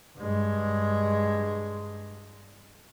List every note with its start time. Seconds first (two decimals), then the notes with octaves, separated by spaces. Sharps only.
0.18 G2 G#3